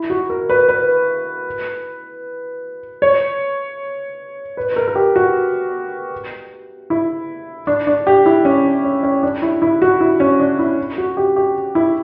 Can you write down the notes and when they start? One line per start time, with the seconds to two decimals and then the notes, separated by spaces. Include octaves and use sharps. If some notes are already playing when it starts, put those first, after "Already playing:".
Already playing: E4
0.10 F#4
0.30 A#4
0.50 B4
0.69 B4
3.02 C#5
4.57 B4
4.76 A#4
4.88 A#4
4.95 G4
5.16 F#4
6.90 E4
7.67 D4
7.87 D4
8.07 G4
8.26 E4
8.45 C#4
8.65 D4
8.84 C#4
9.03 C#4
9.23 D4
9.42 E4
9.62 E4
9.82 F#4
10.01 E4
10.20 C#4
10.40 D4
10.59 E4
10.98 F#4
11.17 G4
11.36 G4
11.75 E4